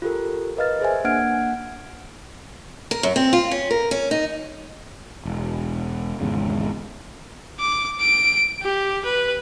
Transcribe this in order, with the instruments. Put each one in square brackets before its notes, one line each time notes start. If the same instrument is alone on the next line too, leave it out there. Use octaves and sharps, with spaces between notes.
[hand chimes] F4 G4 A4 A#4
A#4 B4 D#5 F5 F6 A6
G#4 C5 E5 G#5
A#3 D4 F#5 F6 G#6 D7
[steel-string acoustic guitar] A#4
F#2
C4
F4
C#4
A#4
C#4
D#4
[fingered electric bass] E1
G#1 E2 G#2 C#3
[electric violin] D6
D7
G4
B4